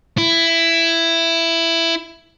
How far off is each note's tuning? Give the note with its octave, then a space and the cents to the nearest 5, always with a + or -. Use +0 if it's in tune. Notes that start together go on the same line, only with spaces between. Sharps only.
E4 +10